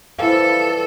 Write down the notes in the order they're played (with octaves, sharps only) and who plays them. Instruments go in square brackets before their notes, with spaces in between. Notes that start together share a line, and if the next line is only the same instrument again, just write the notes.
[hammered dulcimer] E3 F3 G3 [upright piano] E4 F5 [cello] A4